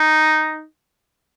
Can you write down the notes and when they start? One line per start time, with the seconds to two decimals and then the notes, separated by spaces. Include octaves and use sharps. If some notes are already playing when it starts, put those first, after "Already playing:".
Already playing: D#4